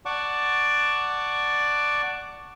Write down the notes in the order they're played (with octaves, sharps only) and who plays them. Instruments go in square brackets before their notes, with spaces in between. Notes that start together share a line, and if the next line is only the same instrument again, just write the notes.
[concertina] D5 F#5 A5 C#6 D6